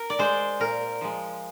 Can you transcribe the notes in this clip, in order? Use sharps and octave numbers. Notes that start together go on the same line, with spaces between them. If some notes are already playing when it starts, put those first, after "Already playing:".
Already playing: A#4
D5
G#3 C5
A#2 A#4
F3 G#3